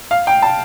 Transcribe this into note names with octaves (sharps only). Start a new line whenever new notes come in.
F5
G5
A5